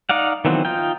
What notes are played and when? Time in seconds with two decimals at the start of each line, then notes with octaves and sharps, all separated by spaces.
0.09 D#4 D5 F5 F#5
0.45 D#3 E3 F#3 B3 C4
0.65 D#4 F4 G5